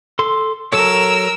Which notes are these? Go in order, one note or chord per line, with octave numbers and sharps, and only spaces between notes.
A4 C6
F#3 A4 A#4 C#5 E6